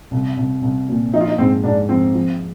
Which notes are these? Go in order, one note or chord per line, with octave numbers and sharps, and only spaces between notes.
C2
C2
C2
A#2
F3 D#4
F4
D#4
G#2 C4
G#2 D4
F3 C4
F3